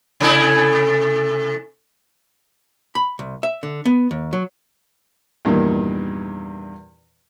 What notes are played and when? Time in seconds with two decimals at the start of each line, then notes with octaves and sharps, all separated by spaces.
0.20 C3 A3 E4
2.95 B5
3.19 C2
3.43 E5
3.63 D3
3.85 B3
4.11 D#2
4.33 F#3
5.45 E2 G2 A#2 D#3